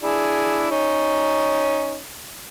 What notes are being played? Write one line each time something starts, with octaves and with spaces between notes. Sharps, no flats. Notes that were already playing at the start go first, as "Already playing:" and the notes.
D4 E4 G#4
C#4 D#4